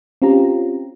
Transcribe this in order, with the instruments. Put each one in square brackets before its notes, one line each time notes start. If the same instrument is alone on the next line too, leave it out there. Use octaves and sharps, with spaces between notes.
[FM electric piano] C4 C#4 F4 G4 A#5